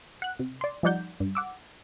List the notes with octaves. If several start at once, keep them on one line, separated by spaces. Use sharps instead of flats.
F#5 F#6
C3
D5 C6
F3 G3 D#4 D5 F#5 G6
G2
F#5 D6 E6